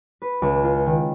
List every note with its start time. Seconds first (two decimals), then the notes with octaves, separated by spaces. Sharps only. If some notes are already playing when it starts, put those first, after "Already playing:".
0.22 B4
0.42 C#2
0.64 F4
0.86 D#3